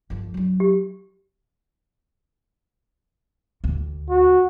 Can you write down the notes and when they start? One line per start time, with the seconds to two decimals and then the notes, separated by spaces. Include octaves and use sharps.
0.10 G1 F3
0.34 F#3 D4
0.60 G4
3.64 D2
4.09 F#4